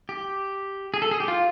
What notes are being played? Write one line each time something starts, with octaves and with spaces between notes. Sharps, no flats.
G4
G#4
A4
G#4
G4
F4